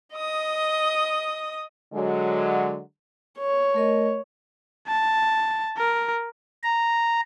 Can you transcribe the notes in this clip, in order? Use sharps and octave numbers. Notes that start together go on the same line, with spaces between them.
D#5 D#6
D3 F#3 G#3
C#5
A3 A#4 D#5
A5
A#4
A#5